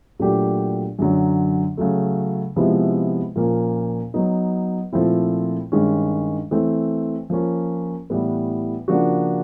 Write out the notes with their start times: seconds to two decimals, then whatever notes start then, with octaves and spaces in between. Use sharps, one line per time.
0.19 A#2 F#3 A3 D4 G4
0.99 F#2 D3 F#3
1.77 C#3 F#3 A3
2.56 C3 F3 G#3 B3 E4
3.36 A#2 F3 A#3 C#4
4.14 F#3 B3 D#4
4.93 A#2 F3 A3 C4 E4
5.72 G2 D#3 G#3 C#4
6.51 E3 A3 C4
7.30 F3 A#3 C#4
8.10 A2 E3 G3 B3
8.88 C#3 F3 A#3 D4 F#4